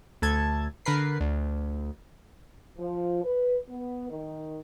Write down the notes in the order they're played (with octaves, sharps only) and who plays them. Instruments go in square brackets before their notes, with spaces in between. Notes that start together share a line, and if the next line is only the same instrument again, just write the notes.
[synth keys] D2 A4 A5 G#6
D3 A#4 B4 C7
D2
[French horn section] F3
B4
B3
D#3